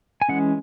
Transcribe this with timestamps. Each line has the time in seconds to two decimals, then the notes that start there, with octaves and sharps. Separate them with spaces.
0.22 G#5
0.29 E3 G#3 C#4 F#5